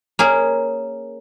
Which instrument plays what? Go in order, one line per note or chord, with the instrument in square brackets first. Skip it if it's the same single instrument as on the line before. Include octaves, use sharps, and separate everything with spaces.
[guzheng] A#3 C#4 G#4